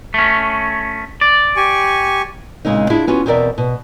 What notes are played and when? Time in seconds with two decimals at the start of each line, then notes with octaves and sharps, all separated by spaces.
0.14 A3 C#4
1.21 D5
1.56 G4 G#5 C#6
2.65 A#2 C#3 G#3 C4 D#4
2.90 D4 E4 F4 G#4
3.07 B3 C#4 F4 F#4
3.26 E2 B2 C4 A#4 D5 E5
3.58 B2